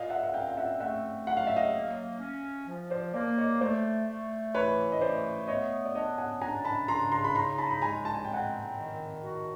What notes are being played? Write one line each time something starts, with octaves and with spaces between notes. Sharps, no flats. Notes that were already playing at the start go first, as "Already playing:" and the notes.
Already playing: A#2 D#5 F5
E5 F#5
F#5
C4 F5 G5
F5
E5 F#5
A3 E5 F#5
F#3 F#5
F5
E5
D#5 F5
A#3
C#4
F3
C5 D5
A#3 C5 D5
C#5 D#5
A3 C5 D5
A3
E3 B4 C#5
D#5
A3 C5 D5
B3 C#5 D#5
D5
D4 C#5 D#5
F#5 G#5
D4 G#5 A#5
A5 B5
C#3 A#5 C6
A#5 C6
B5
D#4 A#5 C6
A5 B5
B5
G#3 G#5 A#5
A5
G#5
C4 G5
F#5 G#5
D#3
F#4